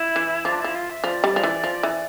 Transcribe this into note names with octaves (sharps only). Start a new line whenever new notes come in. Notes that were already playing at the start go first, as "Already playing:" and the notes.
Already playing: E4
E3
F3 D4
F3 E4
F4
E5
F3 D5
G3
F3
E3
F3
E3